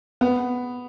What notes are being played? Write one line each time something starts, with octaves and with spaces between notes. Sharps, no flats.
B3